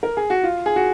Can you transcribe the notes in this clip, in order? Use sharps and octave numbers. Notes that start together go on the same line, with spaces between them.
A#4
G#4
F#4
F4
G#4
F#4